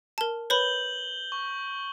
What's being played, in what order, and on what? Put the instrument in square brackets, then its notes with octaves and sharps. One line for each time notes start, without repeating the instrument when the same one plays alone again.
[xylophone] A#4 A5
[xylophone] B4 C#5 B5 [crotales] G6 F#7 G7
[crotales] C#6